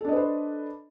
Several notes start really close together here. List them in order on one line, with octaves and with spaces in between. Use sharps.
A4 D4 D#5 B4 C5